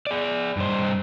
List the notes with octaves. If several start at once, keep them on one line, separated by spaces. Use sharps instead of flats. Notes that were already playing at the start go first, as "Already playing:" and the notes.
G#4 D5
G2 C5